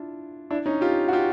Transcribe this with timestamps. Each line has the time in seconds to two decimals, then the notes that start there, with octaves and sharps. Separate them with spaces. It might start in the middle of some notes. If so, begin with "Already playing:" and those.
Already playing: D4 E4 F4
0.51 D4 E4
0.66 C#4 D#4
0.81 F4 G4
1.09 F#4
1.13 F4 G4